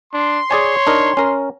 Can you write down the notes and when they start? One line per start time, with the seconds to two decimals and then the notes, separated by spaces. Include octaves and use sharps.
0.14 D4 C6
0.51 G#4 C#5 D5 G#5
0.87 D4 D#4 A#4
1.17 C#4 A#4